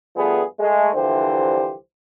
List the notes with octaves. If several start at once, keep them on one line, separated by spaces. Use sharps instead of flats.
G2 F3 A3 B3 G#4
G#3 A3
C2 D3 E3 F3 G4 C5